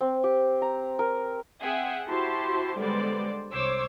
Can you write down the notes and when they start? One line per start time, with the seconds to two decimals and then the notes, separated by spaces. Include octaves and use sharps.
0.01 C4
0.24 G4
0.62 A#5
0.99 A#4
1.61 C4 G#4 E5 F#5 G5
2.08 E4 F#4 G4 C5 A5 C6
2.78 D3 G3 G#3 B3 C5 D5
3.52 C2 C5 C#5 D6 E6